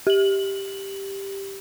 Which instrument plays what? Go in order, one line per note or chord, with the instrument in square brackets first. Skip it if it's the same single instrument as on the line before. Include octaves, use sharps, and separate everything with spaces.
[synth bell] G4 F#7